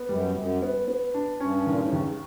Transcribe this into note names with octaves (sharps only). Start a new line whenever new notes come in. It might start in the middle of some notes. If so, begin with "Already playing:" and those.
Already playing: B3
F#2 G3
F#2 G3
B3
B3
D4
G2 C#4
A#2 D#3
A2
D#2 G#2